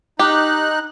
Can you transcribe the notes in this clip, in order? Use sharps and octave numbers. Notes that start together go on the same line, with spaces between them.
D#4 G4 F#6